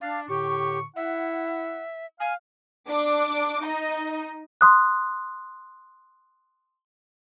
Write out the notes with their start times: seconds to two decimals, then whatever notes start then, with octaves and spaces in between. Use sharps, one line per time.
0.01 D4 F5
0.29 A2 D3 G4 C#6
0.96 E4 E5 F#5
2.20 F5 G#5
2.88 D4 D6
3.61 D#4 D#5
4.61 C6 D#6 F#6